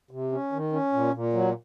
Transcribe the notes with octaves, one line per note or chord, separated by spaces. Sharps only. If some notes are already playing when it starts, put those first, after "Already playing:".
C3
C#4
D#3
C#4
A#2
A#2
F#3